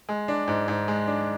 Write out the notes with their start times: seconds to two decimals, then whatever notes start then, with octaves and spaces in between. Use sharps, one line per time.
0.09 G#3
0.28 D4
0.48 G#2
0.68 G#2
0.88 G#3
1.07 D4